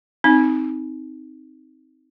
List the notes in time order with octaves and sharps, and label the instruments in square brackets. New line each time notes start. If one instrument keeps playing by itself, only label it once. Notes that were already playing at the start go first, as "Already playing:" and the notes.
[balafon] C4 D#4